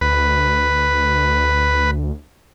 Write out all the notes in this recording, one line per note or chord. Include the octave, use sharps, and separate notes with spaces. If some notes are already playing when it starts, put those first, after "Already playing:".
D2 B4